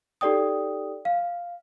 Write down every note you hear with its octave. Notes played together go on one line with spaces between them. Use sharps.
D#4 G4 A4 D5 G5 D#6
F5